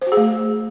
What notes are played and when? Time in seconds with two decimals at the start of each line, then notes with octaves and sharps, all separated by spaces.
0.02 C5
0.07 F#4
0.12 G#4
0.17 A3